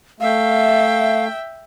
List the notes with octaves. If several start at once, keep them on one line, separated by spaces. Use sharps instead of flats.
A3 E5 F5 G5